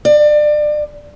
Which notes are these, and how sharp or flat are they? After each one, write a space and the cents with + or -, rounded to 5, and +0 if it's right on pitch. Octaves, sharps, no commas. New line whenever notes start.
D5 +30